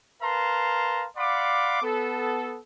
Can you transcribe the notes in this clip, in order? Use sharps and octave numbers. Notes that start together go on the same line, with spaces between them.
A#4 B4 F5 A5 A#5 C6
D5 F5 F#5 B5 C6 D6
B3 A4